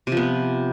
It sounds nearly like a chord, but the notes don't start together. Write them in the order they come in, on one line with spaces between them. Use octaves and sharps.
C3 F3 B3